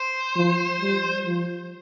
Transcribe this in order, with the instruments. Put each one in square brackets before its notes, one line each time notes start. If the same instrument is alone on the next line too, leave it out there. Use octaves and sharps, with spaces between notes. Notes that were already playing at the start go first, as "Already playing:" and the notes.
Already playing: [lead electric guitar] C5
[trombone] F3
G3
F3